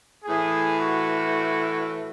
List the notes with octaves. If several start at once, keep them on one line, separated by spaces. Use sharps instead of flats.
A2 E3 G#4
F#4